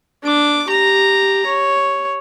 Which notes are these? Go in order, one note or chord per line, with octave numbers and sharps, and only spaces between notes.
D4 D6
G4 A#5
C#5